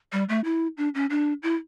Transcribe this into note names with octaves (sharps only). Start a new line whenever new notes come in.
G3
A3
E4
D4
C#4
D4
E4